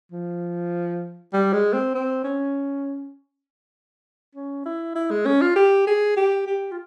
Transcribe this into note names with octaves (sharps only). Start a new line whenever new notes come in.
F3
G3
G#3
C4
C4
C#4
C#4
E4
E4
G#3
C#4
F4
G4
G#4
G4
G4
F4